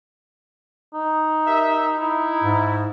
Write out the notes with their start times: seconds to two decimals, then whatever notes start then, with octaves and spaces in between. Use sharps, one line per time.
0.94 D#4
1.47 G4 A#4 E5
1.97 E4
2.43 G#2